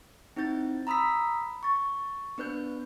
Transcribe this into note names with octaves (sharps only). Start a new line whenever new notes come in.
C4 D#4 E4 G6 A6
A#5 B5 D#6 E6 B6
C#6 A6
B3 D4 B4 F#6 G6